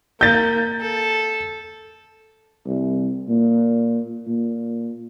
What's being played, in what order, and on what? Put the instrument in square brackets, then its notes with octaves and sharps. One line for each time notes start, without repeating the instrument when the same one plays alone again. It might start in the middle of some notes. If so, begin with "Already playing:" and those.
[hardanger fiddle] A#3 [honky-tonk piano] G6 A6
[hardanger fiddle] A4
[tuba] C2
A#2
A#2